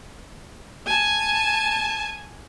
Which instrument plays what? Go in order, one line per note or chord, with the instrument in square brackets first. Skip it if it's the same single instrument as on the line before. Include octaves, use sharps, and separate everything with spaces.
[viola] G#5 A5